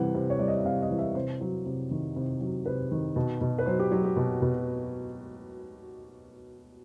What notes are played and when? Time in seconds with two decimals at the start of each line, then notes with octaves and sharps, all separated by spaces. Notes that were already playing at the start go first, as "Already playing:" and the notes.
Already playing: C3 E3 G3 F#5
0.15 C3
0.30 C#5
0.39 G3 D5
0.48 D#5
0.57 E5
0.65 C3 F5
0.82 D#5
0.91 E3
0.98 E5
1.15 C3 C5
1.41 F#3
1.66 C3
1.91 D#3
2.16 C3
2.41 F#3
2.66 C3 B4
2.92 D#3
3.16 B2
3.41 B2
3.59 B4
3.66 F#3 C5
3.79 G4
3.91 F#3 F#4
4.04 G4
4.16 B2
4.42 B2